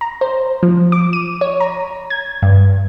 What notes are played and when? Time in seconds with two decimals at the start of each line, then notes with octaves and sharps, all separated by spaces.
0.01 A#5
0.21 C5
0.63 F3
0.92 D6
1.13 D#7
1.41 C#5
1.60 A#5
2.10 G#6
2.42 G2